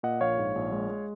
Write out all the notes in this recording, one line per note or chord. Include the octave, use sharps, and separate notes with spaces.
A#2 D#5 F#5
A#1 C#5 F5
G#2
A#1
G#3
G#3